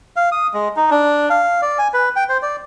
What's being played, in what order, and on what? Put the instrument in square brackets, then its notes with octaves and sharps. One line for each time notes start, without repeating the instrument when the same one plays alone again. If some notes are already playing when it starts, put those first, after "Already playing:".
[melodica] F5
D#6
G#3
D#4
D4
F5
D5
G#5
B4
G5
C5
D5